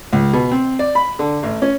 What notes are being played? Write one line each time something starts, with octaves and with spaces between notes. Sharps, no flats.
C#2
B2
C4
D5
B5
D3
A1
C#4